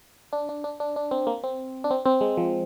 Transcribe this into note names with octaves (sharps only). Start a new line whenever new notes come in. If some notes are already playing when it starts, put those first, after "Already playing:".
D4
D4
D4
D4
D4
C4
A#3
C4
D4
C4
C4
G#3
F3